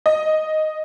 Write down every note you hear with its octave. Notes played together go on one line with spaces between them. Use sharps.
D#5